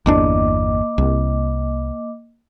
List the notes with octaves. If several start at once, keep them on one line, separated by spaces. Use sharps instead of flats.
G1 E2 A#3 D4 D#5 D6
C2